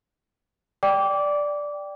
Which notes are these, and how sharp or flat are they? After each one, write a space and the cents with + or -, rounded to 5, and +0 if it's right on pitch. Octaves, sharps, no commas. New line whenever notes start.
D5 +0 G5 +0 D6 -20